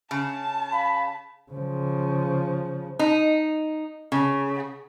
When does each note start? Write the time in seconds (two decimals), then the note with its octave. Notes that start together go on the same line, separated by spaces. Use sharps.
0.11 C#3 A5
0.73 F5 B5
1.52 C#3 F3
2.99 D#4
4.12 C#3